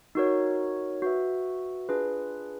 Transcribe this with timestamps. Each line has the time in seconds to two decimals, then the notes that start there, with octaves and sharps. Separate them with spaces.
0.15 D#4 F#4 A#4 C#5
1.02 F#4 B4 E5
1.89 D4 F4 G#4 B4